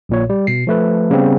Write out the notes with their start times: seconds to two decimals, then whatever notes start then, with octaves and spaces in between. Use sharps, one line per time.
0.09 A#1 A#2 C#5
0.30 G3
0.47 B2 C7
0.67 F3 A3 B4
1.11 C#3 G3 B3 C4